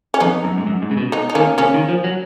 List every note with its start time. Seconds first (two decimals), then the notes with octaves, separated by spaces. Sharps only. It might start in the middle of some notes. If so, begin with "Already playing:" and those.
0.14 C#4
0.20 F2 B3 D#4
0.44 F#2
0.58 G#2
0.67 F#2
0.82 G#2
0.91 C#3
0.97 B2
1.12 B3 D#4
1.30 D#4
1.35 D#3 A#3 C#4
1.58 C#3 A#3 C#4
1.74 D#3
1.89 F3
2.04 F#3